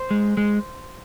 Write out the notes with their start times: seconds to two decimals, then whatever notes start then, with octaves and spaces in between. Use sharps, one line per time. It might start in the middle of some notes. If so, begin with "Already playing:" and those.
Already playing: C5
0.11 G#3
0.37 G#3